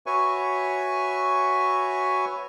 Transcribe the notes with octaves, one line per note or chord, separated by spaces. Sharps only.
F#4 B4 C#5 E5 G#5 C#6